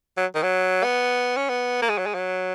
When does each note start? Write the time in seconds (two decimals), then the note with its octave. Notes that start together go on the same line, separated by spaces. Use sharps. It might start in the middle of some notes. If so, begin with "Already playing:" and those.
0.17 F#3
0.35 D#3
0.43 F#3
0.84 B3
1.37 C#4
1.49 B3
1.82 A#3
1.89 G#3
1.98 F#3
2.06 G#3
2.14 F#3